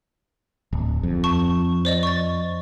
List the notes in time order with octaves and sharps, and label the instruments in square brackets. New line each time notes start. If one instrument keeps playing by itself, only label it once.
[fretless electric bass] D1
F2
[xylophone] A5 C#6
C5 D5 D#5
C#6 A6